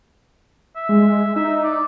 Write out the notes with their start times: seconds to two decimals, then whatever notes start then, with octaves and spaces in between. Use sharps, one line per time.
0.76 E5
0.89 G#3
1.36 D#4 E5
1.64 D5